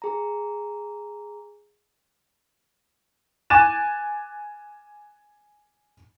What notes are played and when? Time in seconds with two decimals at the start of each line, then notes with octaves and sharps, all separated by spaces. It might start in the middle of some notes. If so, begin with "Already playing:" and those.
0.02 G#4 A#5
3.50 G#5 D6 F#6 A6 D#7 E7